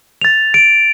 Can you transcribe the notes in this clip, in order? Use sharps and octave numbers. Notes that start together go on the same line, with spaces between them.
A6 F7
D7